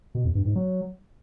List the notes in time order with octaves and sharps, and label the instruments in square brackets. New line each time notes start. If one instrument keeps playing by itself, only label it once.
[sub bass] B2
E2
G2
G#2
F#3